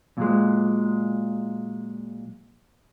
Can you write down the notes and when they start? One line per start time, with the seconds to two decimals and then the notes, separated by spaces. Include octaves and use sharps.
0.18 A#2 F#3 G#3